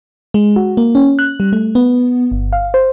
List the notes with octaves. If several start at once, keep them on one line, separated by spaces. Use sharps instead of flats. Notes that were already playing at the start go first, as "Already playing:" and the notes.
G#3
F#4
A#3
C#4
F#6
G3
A3
B3
G1
F5
C5